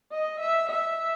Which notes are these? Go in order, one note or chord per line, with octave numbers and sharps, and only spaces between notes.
D#5
E5
E5